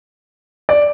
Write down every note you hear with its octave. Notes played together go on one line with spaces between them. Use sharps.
D5